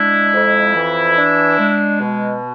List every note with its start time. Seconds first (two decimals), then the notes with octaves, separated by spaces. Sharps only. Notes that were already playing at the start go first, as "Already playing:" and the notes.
Already playing: G#3 D4 E4
0.34 F2
0.75 E3
1.16 D4
1.58 G#3
2.00 B2